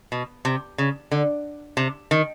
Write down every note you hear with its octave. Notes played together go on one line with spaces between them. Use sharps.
B2
C3
C#3
D3
C3
D#3